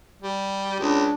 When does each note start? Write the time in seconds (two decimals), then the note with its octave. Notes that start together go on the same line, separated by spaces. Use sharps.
0.22 G3
0.79 C#2 D4